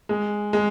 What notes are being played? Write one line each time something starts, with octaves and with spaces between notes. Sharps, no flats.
G#3
G#3